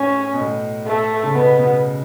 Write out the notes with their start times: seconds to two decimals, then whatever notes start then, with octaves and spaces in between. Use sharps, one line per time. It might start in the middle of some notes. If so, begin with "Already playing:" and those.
Already playing: A2 C#4
0.33 B2
0.41 A2
0.87 A3
1.23 C#3
1.35 B2 B3
1.58 B2